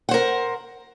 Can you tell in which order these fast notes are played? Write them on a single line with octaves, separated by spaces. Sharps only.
F#5 C5 A#4